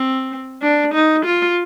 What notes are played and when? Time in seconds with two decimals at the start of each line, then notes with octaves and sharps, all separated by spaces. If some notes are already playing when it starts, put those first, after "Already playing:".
Already playing: C4
0.63 D4
0.94 D#4
1.25 F4